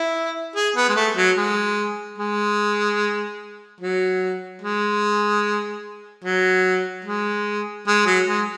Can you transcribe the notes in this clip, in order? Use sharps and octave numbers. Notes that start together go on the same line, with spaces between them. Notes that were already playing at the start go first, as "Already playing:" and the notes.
Already playing: E4
G#4
B3
G#3
A3
F#3
G#3
G#3
F#3
G#3
F#3
G#3
G#3
F#3
G#3